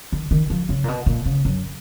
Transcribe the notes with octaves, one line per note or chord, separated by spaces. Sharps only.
D#3
D#3
F3
C#3
A#2
B2
A#2
C#3
F#2